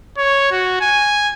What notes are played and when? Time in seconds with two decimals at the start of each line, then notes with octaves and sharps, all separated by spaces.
0.18 C#5
0.51 F#4
0.81 G#5